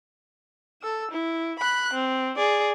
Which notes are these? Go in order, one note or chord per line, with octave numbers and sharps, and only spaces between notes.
A4 E6
E4
B5 F#6
C4
G#4 D5